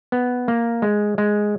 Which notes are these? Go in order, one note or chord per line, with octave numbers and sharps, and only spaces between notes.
B3
A#3
G#3
G#3